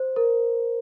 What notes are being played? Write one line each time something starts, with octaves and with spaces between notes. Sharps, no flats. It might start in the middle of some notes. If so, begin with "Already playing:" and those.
Already playing: C5
A#4